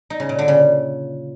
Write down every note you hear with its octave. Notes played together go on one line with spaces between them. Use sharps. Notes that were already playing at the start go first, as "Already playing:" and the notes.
D#4
C#3
A#2
D3
C#3